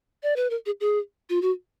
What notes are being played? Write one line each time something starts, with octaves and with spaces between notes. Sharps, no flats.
D5
B4
A#4
G#4
G#4
F4
F#4